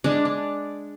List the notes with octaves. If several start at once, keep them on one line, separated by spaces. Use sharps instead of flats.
G#3 D4
D4